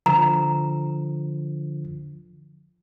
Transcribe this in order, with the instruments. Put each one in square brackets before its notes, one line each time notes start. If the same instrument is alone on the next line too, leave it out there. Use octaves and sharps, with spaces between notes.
[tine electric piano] D3 F3 [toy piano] A#5